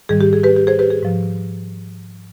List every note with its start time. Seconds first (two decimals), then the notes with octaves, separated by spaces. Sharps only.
0.09 G#2 D#3 G3 G#4
0.21 G4
0.33 G#4
0.44 G4 B4
0.56 G4
0.67 G#4 C5
0.79 G4 B4
0.90 G#4
1.03 G#2 F3